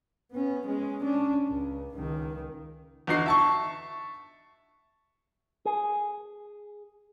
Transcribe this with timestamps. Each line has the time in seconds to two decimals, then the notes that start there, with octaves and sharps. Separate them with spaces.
0.31 B3 C#4
0.67 G#3 C#4
1.03 C#4 D4
1.48 C#2
1.95 C#2 D#3
3.07 E2 D3 D#4 F#4 C7
3.26 E5 A5 C#6
5.65 G#4